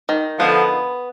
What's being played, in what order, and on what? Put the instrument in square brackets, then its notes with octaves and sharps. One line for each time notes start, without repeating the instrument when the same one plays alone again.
[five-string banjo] D#3
[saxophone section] D3 F3 [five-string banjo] B3